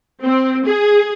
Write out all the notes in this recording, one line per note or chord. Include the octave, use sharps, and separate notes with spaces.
C4
G#4